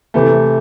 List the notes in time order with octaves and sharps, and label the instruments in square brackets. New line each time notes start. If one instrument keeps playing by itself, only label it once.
[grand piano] C3 E3 A3